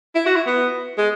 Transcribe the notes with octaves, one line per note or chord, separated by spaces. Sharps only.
E4
F#4
E4
B3
G#3